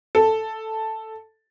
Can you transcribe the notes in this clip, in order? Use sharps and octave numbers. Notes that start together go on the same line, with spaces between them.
A4